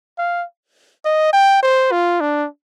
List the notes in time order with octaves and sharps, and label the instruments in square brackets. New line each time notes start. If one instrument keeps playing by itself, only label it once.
[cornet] F5
D#5
G5
C5
F4
D4